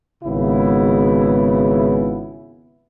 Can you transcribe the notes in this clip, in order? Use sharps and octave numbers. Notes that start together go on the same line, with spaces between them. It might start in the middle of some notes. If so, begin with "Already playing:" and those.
G#1 C#3 B3 E4